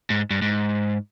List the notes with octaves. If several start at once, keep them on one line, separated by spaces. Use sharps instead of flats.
G#2
G2
G#2